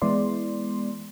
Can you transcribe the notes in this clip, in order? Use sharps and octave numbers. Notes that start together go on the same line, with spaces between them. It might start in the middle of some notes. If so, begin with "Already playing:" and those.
E3 G#3 B3 E4 D5 C6